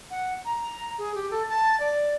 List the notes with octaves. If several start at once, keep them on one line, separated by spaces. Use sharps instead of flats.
F#5
A#5
G#4
G4
A4
A5
D5